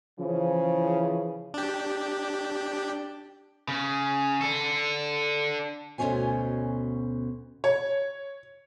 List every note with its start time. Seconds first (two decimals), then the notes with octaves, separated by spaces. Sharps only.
0.19 C#3 E3 F3
1.54 D4 G4
3.68 C#3
4.41 D4 A4
5.98 D2 B2 C4 C#4 C5 G#5
7.64 C#5